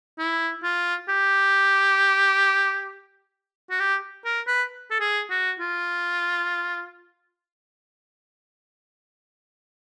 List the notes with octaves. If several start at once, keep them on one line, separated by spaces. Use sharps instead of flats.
E4
F4
G4
F#4
G4
A#4
B4
A4
G#4
F#4
F4